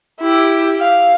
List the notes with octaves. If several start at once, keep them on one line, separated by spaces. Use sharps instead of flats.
E4 G4
F5